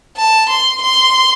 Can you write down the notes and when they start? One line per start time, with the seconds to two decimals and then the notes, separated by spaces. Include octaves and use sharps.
0.17 A5
0.49 C6
0.82 C6